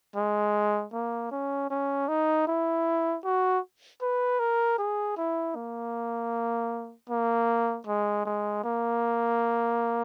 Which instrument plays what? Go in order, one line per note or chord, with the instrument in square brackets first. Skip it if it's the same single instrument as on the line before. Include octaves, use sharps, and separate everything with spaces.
[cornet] G#3
A#3
C#4
C#4
D#4
E4
F#4
B4
A#4
G#4
E4
A#3
A#3
G#3
G#3
A#3